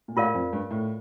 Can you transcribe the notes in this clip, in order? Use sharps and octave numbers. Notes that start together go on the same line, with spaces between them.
A#2
A2 F4 A#4 D5 F5
F2
G2
A2